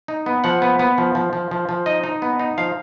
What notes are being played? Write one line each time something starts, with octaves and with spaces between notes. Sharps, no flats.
D#4
B3
F3 F#5
B3
B3
F3
F3
F3
F3
F3
D#4 D#5
D#4
B3
D#4
F3 F5